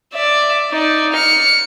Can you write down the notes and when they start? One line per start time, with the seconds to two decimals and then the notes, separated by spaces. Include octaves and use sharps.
0.13 D5 E5
0.71 D#4 D5
1.13 F6 C#7